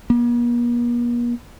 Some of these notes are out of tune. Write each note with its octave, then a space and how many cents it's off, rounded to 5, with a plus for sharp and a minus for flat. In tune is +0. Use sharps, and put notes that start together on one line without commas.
A#3 +45